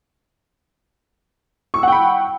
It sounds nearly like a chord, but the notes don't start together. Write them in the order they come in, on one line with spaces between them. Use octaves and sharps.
C#6 E6 F#5 G5 B5